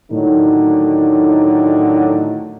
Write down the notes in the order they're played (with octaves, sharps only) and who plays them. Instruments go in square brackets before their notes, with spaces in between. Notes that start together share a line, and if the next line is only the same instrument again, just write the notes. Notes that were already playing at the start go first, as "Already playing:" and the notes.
[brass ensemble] A2 D3 D#3 F#3 D#4